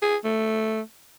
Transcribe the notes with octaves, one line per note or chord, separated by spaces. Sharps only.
G#4
A3